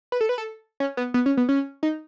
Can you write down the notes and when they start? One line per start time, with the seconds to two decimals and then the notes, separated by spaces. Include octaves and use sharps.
0.12 B4
0.21 A4
0.29 B4
0.38 A4
0.80 C#4
0.97 B3
1.14 B3
1.26 C#4
1.37 B3
1.49 C#4
1.83 D#4